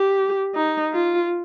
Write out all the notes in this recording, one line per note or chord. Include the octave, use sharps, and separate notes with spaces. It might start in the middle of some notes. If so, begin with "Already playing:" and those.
Already playing: G4
D#4
F4